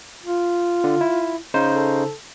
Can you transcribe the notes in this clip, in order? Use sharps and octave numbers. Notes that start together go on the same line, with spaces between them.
F4
D3
E4
C#3 D#4 C5
A4